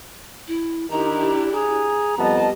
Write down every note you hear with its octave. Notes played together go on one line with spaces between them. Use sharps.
E4
D#3 D4 E4 G4 A#5
G#4 A#5
F2 G3 B3 D#5 A5